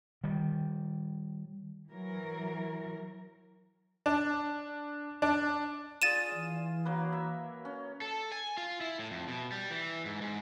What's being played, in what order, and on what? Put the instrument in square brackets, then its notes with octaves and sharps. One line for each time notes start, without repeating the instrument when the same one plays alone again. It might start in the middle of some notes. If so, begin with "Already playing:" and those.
[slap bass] D#3 G3
[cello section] E3 F#3 A#4
[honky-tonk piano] D4
D4
[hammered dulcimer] F4 G#4 [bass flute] D5 [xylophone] A6 D#7 E7
[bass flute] E3
[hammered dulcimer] F#3 A#3 B4
E5
C#4
[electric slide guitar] A4
G#5
F4
E4
A2
F2
B2
G3
E3
G#2
G#2